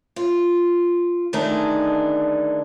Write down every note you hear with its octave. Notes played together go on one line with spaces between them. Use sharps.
F4
D3 D#3 A3 D4 D#4 G#4